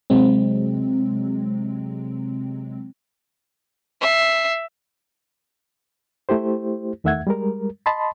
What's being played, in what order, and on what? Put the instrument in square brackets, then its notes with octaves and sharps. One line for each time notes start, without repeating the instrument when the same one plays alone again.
[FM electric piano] C3 F#3 G#3 C4
[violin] E5 C7
[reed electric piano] A3 E4 G4 C5
E2 D#3 A3 E5 F#5 G#6
G3 G#3 A#4
D#5 A5 B5 C6